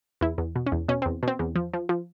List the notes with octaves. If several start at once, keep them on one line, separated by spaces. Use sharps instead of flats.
E2 E4
E2
B2
C#4
E2
B2 C#4
E2 C4
B2 C4
E2
F3
F3
F3